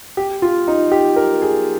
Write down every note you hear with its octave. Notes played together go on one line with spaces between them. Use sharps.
G4
F4
D#4
G4
A#4
G#4